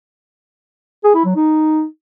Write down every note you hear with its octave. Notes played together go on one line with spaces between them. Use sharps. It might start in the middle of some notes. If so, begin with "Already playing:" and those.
G#4
E4
F#3
D#4